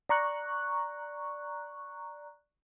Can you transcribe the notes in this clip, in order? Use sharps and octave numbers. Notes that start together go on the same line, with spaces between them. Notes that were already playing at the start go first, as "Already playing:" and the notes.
D5 A#5 C#6 F#6